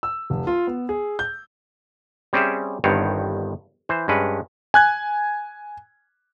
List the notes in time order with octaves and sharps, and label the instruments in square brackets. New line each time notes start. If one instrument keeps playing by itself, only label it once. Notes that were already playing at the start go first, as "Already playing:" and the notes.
[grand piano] E6
F1
F4
B3
G#4
G6
[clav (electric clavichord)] G3 C4 C#4 G4 G#4 E5
G1 G2 D#3 B3 C4 C#5
E3 C5
G2 G#3 C#4 B4
[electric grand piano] G#5 F#6 G#6